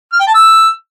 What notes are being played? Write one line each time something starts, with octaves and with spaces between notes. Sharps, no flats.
F6
G5
A5
E6